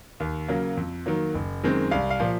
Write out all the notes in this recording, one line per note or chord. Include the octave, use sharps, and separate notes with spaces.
D#2
C#3 F#3 A#3
F2
D#3 F#3 A#3
F#1
F#2 D#3 G#3 C4
C2 F5
F5
A#2 F3